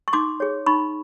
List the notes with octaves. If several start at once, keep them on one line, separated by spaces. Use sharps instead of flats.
C#6
D#4 C6 D6
G#4 C#5
D#4 B5 C#6